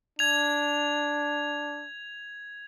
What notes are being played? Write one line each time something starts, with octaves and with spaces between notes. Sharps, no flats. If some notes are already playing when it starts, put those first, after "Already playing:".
D4 G#6 F7